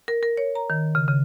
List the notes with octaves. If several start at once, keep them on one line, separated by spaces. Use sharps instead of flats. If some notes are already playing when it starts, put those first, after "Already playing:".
A#4
A#4
C#5
A#5
D#3
C#3
C#3